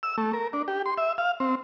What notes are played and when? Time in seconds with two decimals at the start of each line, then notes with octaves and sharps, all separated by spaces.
0.03 E6
0.18 A3
0.33 A#4
0.53 D4
0.68 G4
0.86 C6
0.98 E5
1.18 F5
1.40 C4